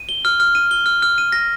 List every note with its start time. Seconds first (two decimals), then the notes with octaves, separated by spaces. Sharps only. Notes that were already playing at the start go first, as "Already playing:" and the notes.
Already playing: D#7
0.09 G7
0.25 F6
0.40 F6
0.55 D#7
0.71 G7
0.86 F6
1.02 F6
1.18 D#7
1.32 A#6